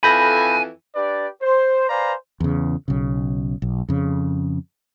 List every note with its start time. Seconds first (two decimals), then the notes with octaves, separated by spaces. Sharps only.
0.03 F2 E3 A4 G#5 B5 G6 A#6
0.96 D4 G4 B4 D5
1.42 C5
1.89 B4 C5 D5 F5 G#5 A#5
2.40 E2 C#3
2.88 B1 C#3
3.62 B1
3.89 F2 C#3